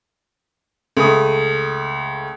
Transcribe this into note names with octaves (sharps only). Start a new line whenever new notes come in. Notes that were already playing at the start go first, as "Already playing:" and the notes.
C#2 A3 D#6